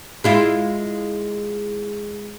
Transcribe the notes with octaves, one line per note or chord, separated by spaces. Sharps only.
G#3 E4 F4